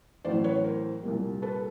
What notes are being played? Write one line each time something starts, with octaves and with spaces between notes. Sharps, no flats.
A1 A2 F#3 C5 D5
B4 C#5
A#4 C5
C2 A#2 G3
A4 B4